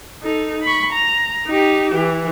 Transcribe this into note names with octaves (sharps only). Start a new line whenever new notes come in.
D#4 A4
B5 C#6
A#5
D#4 G4
E3